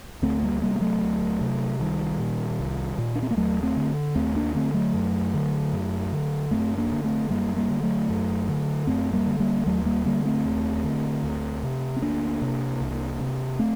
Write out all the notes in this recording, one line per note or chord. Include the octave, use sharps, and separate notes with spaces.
D2 A3 C4
G3 A#3
C3 G3 A#3
A#3
F#3 A3
D2
C3
C2 D#3 G3
A#2
C2
A#2
D4
C4
A#3
D#2 F#3 A3
A3 C4
D3
D#2 A3 C4
A#3 D4
D3 A3 C4
F#3 A3
F#2
D3
F#2
D3
F#2 A3 C4
A#3 D4
D3
A3 C4
F#2 G3 A#3
G3 A#3
D3
F#3 A3
F#2
D3
F#2 A3 C4
G3 A#3
D3
G3 A#3
D#2 F#3 A3
G3 A#3
D3 G3 A#3
A3 C4
D#2
D3
D2
C3
C4
D2 A#3 D4
C3
C2
C3
A3 C4